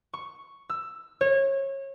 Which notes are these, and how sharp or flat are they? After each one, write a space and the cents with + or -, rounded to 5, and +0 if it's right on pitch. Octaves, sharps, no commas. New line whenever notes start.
C#6 +0
E6 +10
C#5 -25